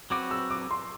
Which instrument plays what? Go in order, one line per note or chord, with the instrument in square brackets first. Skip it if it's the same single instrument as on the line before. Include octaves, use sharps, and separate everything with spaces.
[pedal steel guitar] F#3 C4 F#4 B4 [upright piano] D6
[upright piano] E6
D6
C6